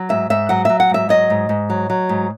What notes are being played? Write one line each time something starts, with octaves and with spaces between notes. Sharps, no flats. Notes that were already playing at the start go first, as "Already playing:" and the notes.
Already playing: F#3
G#2 E5
G#2 E5
F#3 F#5
F#3 E5
F#5
G#2 E5
F#3 D#5
G#2
G#2
F#3
F#3
G#2